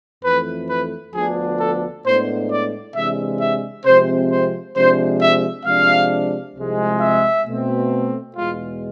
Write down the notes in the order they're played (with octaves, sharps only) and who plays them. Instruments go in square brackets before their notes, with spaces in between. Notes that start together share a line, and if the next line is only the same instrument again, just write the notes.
[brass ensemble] F2 E3 A3 B4
B4
D2 D3 F3 B3 D4 G#4
A4
A2 G#3 B3 D4 C5
D5
C3 E3 G#3 D4 E5
E5
C3 F3 G#3 C4 C5
C5
C3 F3 G#3 D4 C5
E5
C3 F3 G#3 D4 F5
C2 C3 F3 G#3
E5
B2 A3 C4
E2 B2 G#3 F4